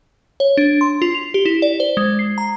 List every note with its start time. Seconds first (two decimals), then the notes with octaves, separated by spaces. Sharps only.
0.40 C#5
0.57 D4
0.81 C6
1.02 F4
1.15 F7
1.34 G4
1.45 E4
1.62 D5
1.80 C5
1.97 G#3
2.19 C7
2.38 A#5